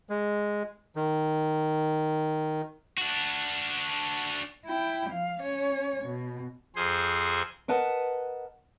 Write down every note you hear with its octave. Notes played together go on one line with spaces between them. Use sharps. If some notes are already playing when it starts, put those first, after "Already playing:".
G#3
D#3
D4 F#4
E4 G5
F3 F5
C#4 C#5
B2
F2 G#4 C5
A#4 B4 D#5 F#5 A5